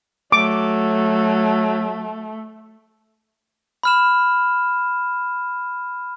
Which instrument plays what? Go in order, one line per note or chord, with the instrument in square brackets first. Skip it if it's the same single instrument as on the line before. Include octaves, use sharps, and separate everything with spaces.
[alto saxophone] F#3 [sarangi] A3 [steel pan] D6
[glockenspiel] B5 F6 E7